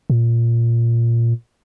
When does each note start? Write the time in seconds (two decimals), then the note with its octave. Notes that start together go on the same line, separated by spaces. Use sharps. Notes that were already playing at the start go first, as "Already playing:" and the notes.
0.10 A#2